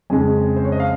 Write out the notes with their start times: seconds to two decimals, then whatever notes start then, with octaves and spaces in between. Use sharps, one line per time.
0.10 F2 C#3 G#3 C#4 G#5
0.56 C5
0.65 C#5
0.72 D#5
0.80 F5